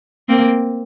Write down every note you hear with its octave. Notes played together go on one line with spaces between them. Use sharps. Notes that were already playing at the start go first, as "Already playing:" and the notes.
A#3 C4